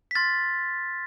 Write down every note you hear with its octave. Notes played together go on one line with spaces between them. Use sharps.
B6
C6 F6 A6